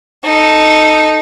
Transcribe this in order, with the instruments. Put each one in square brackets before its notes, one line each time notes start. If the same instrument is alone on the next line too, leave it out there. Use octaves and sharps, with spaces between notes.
[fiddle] D#4 A4